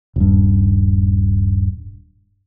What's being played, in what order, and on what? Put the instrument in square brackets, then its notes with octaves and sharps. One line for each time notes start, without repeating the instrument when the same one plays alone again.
[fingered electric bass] D#1 G2